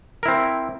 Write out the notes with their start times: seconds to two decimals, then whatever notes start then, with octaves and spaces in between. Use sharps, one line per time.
0.23 A#4
0.26 E4
0.28 C4